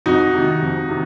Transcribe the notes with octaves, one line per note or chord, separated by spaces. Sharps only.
F2 D#4 F#4
C3 D#3
F2
C3 D#3